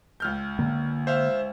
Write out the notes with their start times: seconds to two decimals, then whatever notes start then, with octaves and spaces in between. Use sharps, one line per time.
0.20 C#2 F6 G6
0.59 D3 A#3
1.07 C5 E5 F5